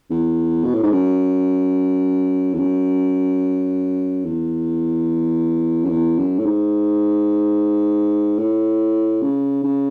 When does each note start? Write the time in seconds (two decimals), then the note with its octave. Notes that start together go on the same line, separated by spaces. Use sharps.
0.10 E2
0.65 B2
0.74 A2
0.83 G#2
0.92 F#2
2.54 E2
2.59 F#2
4.25 E2
5.84 F#2
5.89 E2
6.18 F#2
6.39 A2
6.46 G#2
8.39 A2
9.22 C#3
9.63 C#3